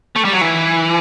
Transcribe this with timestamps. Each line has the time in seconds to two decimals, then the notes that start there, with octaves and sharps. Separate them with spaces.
0.16 A3
0.25 G3
0.33 F#3
0.41 E3